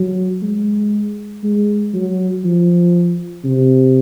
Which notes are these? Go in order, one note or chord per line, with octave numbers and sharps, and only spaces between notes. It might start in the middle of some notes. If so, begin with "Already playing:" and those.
Already playing: F#3
G#3
G#3
F#3
F3
C3